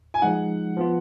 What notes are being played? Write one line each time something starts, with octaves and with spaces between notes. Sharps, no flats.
G#5
F3 G#3 D#4 F#5
F3 B3 F4